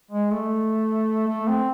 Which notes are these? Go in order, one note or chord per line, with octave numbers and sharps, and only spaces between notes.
G#3
A3
A3
C4